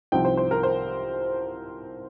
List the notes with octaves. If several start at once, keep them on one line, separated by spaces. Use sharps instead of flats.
C2 C3 F3 C4 D#4 G5
C5
C5
A#4
C5